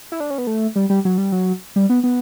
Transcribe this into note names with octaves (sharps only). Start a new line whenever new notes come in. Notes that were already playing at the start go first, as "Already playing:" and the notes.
E4
D4
C#4
B3
A3
G3
G3
F#3
G3
F#3
G3
B3
B3